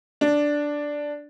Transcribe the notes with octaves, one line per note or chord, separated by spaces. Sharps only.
D4